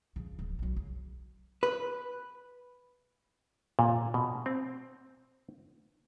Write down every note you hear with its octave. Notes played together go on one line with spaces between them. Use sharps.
C#3 F3
D1
B1 F#3
C#3
B4
A#2
B2
C4